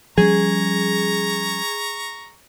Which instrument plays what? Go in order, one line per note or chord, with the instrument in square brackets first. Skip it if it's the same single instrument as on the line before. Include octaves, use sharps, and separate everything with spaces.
[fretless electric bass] F3 G3 C#4 [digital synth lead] G#4 [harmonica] A#5 C#6